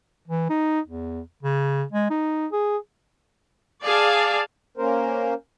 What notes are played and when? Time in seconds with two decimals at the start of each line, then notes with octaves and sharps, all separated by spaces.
0.28 E3
0.50 D#4
0.87 E2
1.43 C#3
1.92 G#3
2.10 D#4
2.52 G#4
3.83 G#4 D5 F5 A5
4.77 A#3 C#4 A#4 C5